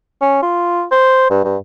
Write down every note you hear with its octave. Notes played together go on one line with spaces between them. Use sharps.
C#4
F4
C5
G2
G2